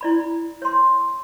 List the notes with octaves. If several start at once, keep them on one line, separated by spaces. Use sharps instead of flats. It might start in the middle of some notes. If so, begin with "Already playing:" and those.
E4 D5 B5
C#5 C6